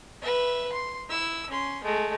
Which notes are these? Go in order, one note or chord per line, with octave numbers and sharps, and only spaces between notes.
B4 E5
C6
E4 E6
C#4 C6
G#3 A3